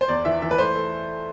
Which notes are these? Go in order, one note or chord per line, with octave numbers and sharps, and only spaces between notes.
C5
E2 D5
E3 E5
E3 E5
B4
A3 C5
A3